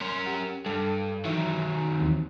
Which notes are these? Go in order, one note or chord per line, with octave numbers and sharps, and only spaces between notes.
C#4 A#4 C6
G4 F#5
G2 A4
D#3 E3 F#3 E5
G#5
D#2 E3 C4